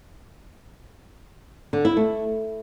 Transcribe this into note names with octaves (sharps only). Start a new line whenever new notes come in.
D3
E4
A3